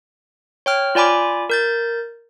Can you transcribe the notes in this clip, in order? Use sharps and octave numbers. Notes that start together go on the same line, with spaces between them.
C#5 G5 F6
F4 D5 G#5 B5 D6
A#4 G6 A6